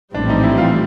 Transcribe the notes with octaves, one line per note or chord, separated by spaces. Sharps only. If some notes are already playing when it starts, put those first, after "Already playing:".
A#1 A2 E3 G3 C4 D4
D#4
E4
F4